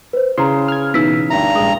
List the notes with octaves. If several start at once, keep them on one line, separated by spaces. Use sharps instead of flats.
B4 C5
C#3 E4 A#5 C6
F6 G#6
B2 E3 D#4 E6 B6
D2 G2 E4 A#5
A#1 G#3 D#6